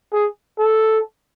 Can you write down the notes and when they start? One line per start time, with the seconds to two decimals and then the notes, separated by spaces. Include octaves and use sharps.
0.12 G#4
0.59 A4